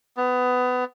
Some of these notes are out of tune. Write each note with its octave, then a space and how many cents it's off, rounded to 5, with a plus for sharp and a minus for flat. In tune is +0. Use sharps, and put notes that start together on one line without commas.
B3 +20